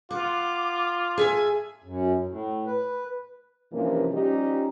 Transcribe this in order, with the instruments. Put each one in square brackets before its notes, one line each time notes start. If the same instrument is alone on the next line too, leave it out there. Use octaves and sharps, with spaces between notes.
[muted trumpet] F4 [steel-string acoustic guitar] F#5 [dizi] D6
[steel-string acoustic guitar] G#4 E5 G#5
[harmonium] F#2
A2
B4
[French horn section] G2 C3 E3 F3 A#3 C#4
F3 G3 C#4 D#4 G4